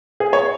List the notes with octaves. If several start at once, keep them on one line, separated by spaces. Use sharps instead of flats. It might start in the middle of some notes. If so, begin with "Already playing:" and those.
G#4
C#5